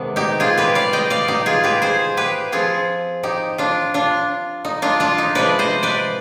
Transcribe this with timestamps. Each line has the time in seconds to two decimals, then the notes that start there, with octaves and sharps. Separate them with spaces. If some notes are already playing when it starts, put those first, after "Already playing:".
Already playing: C3 D#3 G#3 B3 D4
0.16 D#4 G4
0.40 F4 G#4
0.57 G4 B4
0.75 D5 F5
0.93 D#5 G5
1.10 D5 F5
1.28 D#4 G4
1.46 F4 G#4
1.63 G4 B4
1.82 G#4 C5
2.17 G4 B4
2.52 F3 C4 F4 G#4
3.23 D#4 G4
3.58 D4 F4
3.94 D4 F4
4.65 D#4
4.82 D4 F4
5.00 D4 F4
5.18 D#4
5.35 C3 F3 G#3 D4 B4 D5
5.59 C5 D#5
5.83 B4 D5